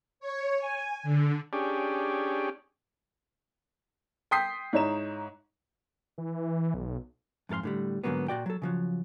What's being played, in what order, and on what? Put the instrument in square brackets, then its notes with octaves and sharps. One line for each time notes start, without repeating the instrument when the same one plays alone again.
[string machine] C#5
G#5
D3
[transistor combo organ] C#4 D4 G4 G#4
[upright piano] G5 C6 D#6 G6 B6 C7
G#2 D#4 E4 C#5 A#5 E7
[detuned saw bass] E3
B1
[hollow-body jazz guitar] F2 G#2 A4 F5 C6
A2 D3 G3
G#2 D3 E3 F#3 A#3 B3
A#2 F#4 D5 G5
F#3 A4
C#3 F3 F#3